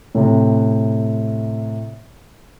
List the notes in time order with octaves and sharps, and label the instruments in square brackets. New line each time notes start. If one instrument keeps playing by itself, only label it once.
[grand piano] A2 C3